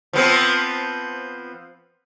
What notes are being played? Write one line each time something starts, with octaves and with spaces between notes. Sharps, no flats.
F3 B3 C4